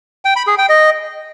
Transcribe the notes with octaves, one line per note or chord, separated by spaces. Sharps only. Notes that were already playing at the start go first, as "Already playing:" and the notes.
G5
B5
G#4
G5
D#5